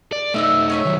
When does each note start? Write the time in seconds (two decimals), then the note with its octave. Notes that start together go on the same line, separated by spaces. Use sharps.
0.12 D5
0.34 A3 D#4 E5 D#6 E6
0.70 C#5 D#5 E5
0.85 D#3 F#3